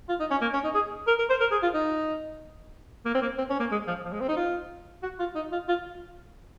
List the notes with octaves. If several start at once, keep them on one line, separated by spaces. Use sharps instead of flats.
F4
D#4
C#4
A#3
C#4
D#4
G#4
A#4
A#4
C5
A#4
G#4
F4
D#4
A#3
C4
A#3
C4
C#4
A#3
G#3
F3
F3
G#3
C4
D#4
F4
F#4
F4
D#4
F4
F4